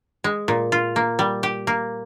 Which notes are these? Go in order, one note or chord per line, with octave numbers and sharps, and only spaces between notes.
G#3
A#2
F4
A#3
G3
G4
A#3